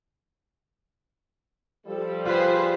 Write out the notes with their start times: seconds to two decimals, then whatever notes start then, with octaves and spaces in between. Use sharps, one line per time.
1.87 F3 G3 A4
2.25 F4 G#4 B4 C5